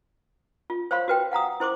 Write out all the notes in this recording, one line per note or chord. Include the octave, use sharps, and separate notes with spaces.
F4
C5 C#5 F5 B5 C6
F#4 B4 G5
F5 F#5 A#5 D#6
E4 C5 C6 D6